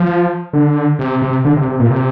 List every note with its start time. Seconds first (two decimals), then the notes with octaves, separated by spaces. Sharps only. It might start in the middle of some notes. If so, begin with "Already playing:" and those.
Already playing: F3
0.53 D3
0.99 C3
1.22 C3
1.45 D3
1.57 C3
1.68 C3
1.80 A#2
1.90 C3